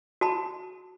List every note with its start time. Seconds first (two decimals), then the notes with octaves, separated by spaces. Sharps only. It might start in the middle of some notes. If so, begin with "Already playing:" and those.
0.21 F#4 A5 B5